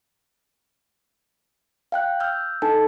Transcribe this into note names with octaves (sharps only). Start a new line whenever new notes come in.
F5 G5 F#6
E6 F6 G6
D#4 A4 G#5 A5